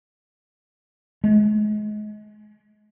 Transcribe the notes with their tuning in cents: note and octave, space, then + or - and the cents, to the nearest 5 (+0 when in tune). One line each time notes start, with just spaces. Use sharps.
G#3 +30